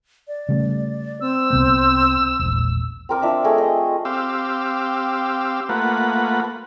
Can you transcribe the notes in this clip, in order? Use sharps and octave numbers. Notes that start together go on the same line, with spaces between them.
D5
C#3 G3 A3
C4 E6
C2 C3 B3
E1 A#1
C4 A#4 D6 D#6
F3 D4 E5
A3 G#4 D#5 G#5
D#5
C4 G4 F5 D6 E6
A3 A#3 F4 B4 F#5